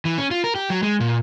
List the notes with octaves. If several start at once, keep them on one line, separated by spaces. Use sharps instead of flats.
E3
C#4
F4
A#4
G4
F#3
G#3
A#2